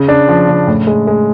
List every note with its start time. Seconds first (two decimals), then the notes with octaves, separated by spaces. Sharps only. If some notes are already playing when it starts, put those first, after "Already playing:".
Already playing: C#3
0.08 D4
0.28 F3
0.49 C#3
0.67 A2
0.87 G#3
1.07 G#3